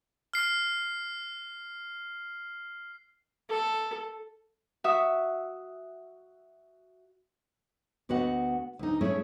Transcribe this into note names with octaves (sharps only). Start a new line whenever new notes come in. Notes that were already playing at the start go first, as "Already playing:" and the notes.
F6 C7
A4
F#4 E5 D#6
D2 B3 F#4 D#5 F#5
D2 D#4
A3 C#4 E4 G#4